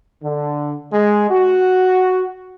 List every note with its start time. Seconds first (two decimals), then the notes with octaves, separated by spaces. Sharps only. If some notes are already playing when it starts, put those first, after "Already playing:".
0.23 D3
0.93 G#3
1.30 F#4